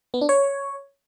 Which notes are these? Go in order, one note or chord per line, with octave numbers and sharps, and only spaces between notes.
B3
D4
C#5